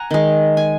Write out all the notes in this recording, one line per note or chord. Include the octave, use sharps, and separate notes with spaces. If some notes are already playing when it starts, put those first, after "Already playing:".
Already playing: F#5 G#5 A#5
D#3 G#3
G#5